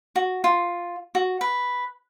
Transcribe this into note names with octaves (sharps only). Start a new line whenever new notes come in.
F#4
F4
F#4
B4